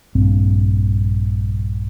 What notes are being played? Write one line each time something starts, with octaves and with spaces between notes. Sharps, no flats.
A#1 G2 C4